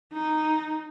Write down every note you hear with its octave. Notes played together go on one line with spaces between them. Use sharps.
D#4